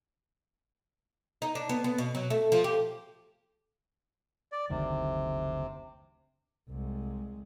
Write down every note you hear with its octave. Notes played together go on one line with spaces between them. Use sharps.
D#4
D4
B3
B3
B2
F#3
A3
F3
G4
D5
F#1 D2 C3 D#3
C2 G#3